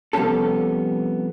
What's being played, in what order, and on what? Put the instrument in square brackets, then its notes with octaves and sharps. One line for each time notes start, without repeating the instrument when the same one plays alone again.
[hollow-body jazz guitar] C3 F3 G3 B3 C#4 A4